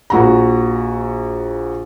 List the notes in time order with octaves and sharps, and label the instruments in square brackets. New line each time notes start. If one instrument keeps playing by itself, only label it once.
[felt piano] A#1 F#4 A#5